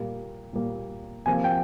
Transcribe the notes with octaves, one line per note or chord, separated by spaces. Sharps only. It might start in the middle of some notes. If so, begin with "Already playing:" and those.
Already playing: A#2 G3 A#3
A#2 G3 A#3
C3 F3 A#3 G#5
G5